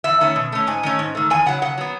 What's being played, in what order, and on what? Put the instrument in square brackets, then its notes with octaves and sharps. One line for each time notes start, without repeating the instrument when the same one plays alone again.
[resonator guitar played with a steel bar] E2 E5
D#3 A3 C#4
B2
A3 C#4
G#2 G#5
D#3 A3 C#4
G#2
D#3 A3
E2 G#5
C#3 F#3 F#5
C#3 F#5
F#3 B3